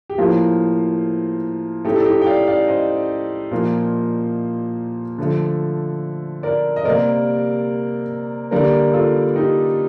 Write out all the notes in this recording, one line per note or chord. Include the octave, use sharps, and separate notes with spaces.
G4
A2 F3 A#3 F4
A2 A3 D#4 G4
A4
D#4 G4
G5
D5 F5
D5 F5
C5 D#5
A#2 F3 A#3
D3 F3 A3
A#4 D5
D#5
C3 G3 A#3 A#4 D5
D3 G3 A#3 A#4 D5
F4 A4
D#4 G4